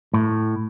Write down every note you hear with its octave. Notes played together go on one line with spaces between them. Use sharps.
A2